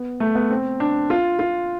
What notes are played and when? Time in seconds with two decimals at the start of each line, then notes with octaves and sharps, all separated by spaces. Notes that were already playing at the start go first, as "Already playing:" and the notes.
Already playing: B3
0.20 A3
0.35 B3
0.51 C4
0.80 D4
1.10 F4
1.39 F4